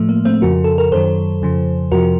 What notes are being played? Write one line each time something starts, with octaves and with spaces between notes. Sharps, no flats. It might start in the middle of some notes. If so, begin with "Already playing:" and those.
Already playing: A2 F3 A3
A#3
A3 C4
F2 C#3 F3 F#4 A#4
A4
A#4
F#2 D#3 F#3 A4 C5
F2 C#3 F3
F2 C3 F3 F#4 A#4